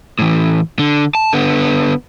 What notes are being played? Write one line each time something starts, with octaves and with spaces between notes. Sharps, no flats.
A2 E3
D3
A5
D3 B3